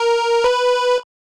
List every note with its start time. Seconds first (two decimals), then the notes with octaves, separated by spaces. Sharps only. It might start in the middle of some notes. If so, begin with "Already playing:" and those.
Already playing: A#4
0.44 B4